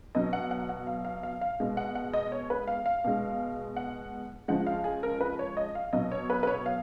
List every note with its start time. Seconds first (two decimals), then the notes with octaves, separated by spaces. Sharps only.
0.15 B2 F#3 D#5
0.33 F#5
0.51 F#5
0.69 F#5
0.87 F5
1.05 F5
1.23 F5
1.41 F5
1.60 B2 G#3
1.77 F#5
1.95 F#5
2.13 D#5
2.32 C#5
2.50 B4
2.68 F5
2.86 F5
3.04 B2 G#3
3.76 F#5
4.48 C#3 F3 G#3 F#5
4.67 F5
4.84 G#4
5.03 A#4
5.21 B4
5.39 C#5
5.57 D#5
5.75 F5
5.93 B2 F#3 D#5
6.12 C#5
6.30 B4
6.43 B4
6.47 C#5
6.66 F5